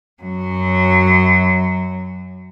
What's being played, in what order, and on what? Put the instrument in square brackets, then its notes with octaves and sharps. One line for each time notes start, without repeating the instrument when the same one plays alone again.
[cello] F#2 F#3